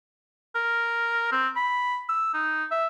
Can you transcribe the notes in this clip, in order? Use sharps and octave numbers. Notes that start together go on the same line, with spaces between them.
A#4
C4
B5
E6
D#4
E5